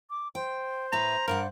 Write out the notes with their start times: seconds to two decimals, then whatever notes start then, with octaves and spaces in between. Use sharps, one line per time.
0.10 D6
0.35 C5 G5
0.92 A2 B4 E5 A#5
1.28 G2 D4 A#4 F#5